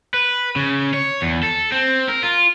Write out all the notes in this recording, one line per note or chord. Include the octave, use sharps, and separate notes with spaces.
B4
C#3
C#5
E2
A4
C4
A#4
F4